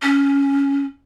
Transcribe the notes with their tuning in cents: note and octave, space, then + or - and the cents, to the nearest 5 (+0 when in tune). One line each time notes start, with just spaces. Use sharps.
C#4 +5